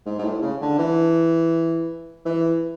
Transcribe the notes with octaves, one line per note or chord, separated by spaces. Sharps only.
G#2
G#2
A2
C#3
D3
E3
E3